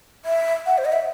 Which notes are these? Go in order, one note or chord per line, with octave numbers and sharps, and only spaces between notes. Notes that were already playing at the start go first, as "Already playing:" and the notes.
E5
F#5
C5
D#5
E5